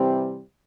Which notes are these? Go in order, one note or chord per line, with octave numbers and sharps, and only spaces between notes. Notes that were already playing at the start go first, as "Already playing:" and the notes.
Already playing: C3 E3 G3 C4